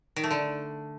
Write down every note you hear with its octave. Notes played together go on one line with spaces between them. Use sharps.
D#3
A3
D3